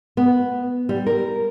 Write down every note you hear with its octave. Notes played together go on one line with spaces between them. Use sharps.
B3
G3
A#4